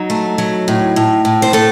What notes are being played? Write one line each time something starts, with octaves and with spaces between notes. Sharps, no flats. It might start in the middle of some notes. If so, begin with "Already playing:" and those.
Already playing: F#3 D#4
A3
F#3
A2
A2
A2
C5
A3 A4